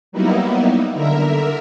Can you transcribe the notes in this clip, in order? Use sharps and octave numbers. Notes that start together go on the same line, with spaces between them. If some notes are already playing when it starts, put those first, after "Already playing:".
F#3 G3 A#3 B3 D#4 E4
D3 A#4 E5